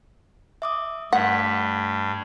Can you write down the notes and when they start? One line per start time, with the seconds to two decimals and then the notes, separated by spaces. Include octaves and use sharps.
0.62 E5 D6 D#6
1.13 G2 A3 F#5 B6